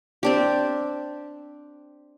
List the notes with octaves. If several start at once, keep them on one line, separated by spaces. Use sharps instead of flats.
C4 D4 G4